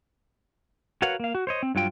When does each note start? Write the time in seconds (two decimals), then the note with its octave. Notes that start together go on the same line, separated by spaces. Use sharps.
1.02 F#4 A#4 B4 C#5 F5 F#5
1.20 A#3 F5
1.35 F#4
1.47 C5 C#5 D#5
1.63 C4
1.75 G2 F#3 F4 G5